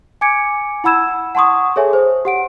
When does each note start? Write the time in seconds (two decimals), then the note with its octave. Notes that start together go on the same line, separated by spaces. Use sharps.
0.21 G#5 D6 G#6 C#7 D7
0.84 E4 F#5 B5 E6 G#6 E7
1.35 F#5 A5 C6 C#6 D#6
1.76 G#4 A4 C#5 E5 G#5
1.93 C5
2.25 G4 F#5 D7